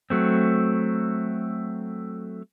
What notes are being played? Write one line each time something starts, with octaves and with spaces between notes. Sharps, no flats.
F#3 A3 C4